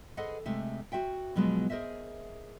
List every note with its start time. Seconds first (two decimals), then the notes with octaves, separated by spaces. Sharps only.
0.17 G#4 A4 B4 C5 D#5 F#5
0.46 C3 G#3 A3 E5
0.92 F#4 C5 E5 G5
1.36 B2 F3 F#3 G#3 B3
1.70 G#4 A#4 C5 D#5 E5